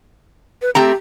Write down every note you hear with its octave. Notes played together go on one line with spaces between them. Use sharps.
B4
A3 C4 G4 A#5